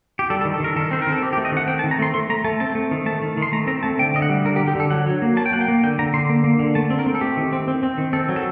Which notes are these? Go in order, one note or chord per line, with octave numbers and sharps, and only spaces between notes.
G4
G3 A4
A4
D#3
A4
D#3 A#4
D#3 A4
C4 C5
A#4
D#3 A4
C4 G4
G4
A3
D#5
D#3 F#5
C4 G5
A5
D#3
A#5
A3 C6
A3 C6
A3 A#5
A3 A5
C4 A5
A3
D#3
A3 A5
D#3
D#3
C6
A3 A#5
C4 A#5
A3 A5
D3 G5
D3 D#5
F#5
G3
D3 A#4
G4
D3
G4
D3 A4
F#3 F#5
F#3
A#3
F#3 A5
G5
A#3 F#5
G5
A#3
D3 G5
D3 A#5
D3 C6
A#3
A#3
D3
A3 A5
C4
A#4
C4
A4
A3 G4
D#3
C4
C4
C4
D#3
C4 A4
F#3
A4